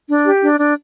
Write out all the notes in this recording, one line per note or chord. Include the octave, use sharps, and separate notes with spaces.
D4
G4
D4
D4